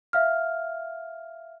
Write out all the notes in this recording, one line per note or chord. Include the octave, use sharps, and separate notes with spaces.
E5 F5 F6